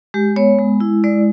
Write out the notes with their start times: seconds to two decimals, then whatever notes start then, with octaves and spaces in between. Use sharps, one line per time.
0.14 G#3 G4
0.36 B3 C#5
0.59 G#3
0.80 E4
1.04 G#3 D5